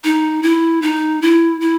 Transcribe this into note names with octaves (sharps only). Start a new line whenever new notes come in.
D#4
E4
D#4
E4
E4